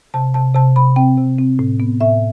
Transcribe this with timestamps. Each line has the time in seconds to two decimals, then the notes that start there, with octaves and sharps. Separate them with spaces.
0.14 C3 A5
0.34 C3 A5
0.55 C3 A5
0.76 C3 B5
0.96 C4 G5
1.18 C3
1.38 C4
1.59 A2
1.80 B3
2.01 A2 E5